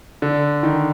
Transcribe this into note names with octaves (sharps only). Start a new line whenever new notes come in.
D3
D#3